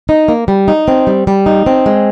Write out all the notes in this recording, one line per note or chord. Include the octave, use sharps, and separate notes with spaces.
D#4
A#3
G3
D#4
C4
G3
G3
D#4
C4
G#3